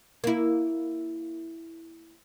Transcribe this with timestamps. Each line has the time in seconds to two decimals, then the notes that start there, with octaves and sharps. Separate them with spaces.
0.24 A#3 E4